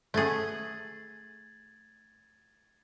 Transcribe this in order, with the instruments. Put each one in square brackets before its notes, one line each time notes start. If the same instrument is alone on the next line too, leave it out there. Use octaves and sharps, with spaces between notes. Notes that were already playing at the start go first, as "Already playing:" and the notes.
[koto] A3 G#4 [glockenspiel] G#6 A6 F#7